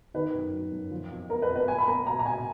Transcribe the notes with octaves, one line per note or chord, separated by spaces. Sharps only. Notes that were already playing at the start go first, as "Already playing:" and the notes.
D#3 B4
F#2
F#3
F#2
F3
F2
B3 A#4
B4
F2
B4
A#3 G#5
B5
A#3 A#5
B2 A#5
A#5
B2 G#5